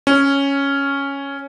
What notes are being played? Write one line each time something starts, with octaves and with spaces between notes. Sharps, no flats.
C#4